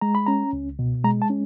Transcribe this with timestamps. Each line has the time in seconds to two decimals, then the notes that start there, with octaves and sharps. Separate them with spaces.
0.01 G#3 A#5
0.15 B5
0.26 C#4 A#5
0.53 C#2
0.79 B2
1.04 G#3 A#5
1.22 A5
1.30 C#4